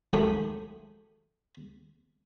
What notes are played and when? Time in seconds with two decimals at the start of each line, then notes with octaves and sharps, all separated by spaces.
0.13 D#3 F#3 G#3 A3 G4 D#6